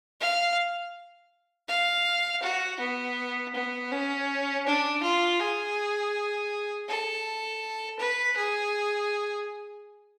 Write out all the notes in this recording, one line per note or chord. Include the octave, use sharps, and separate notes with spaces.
F5
F5
F#4
B3
B3
C#4
D4
F4
G#4
A4
B4
G#4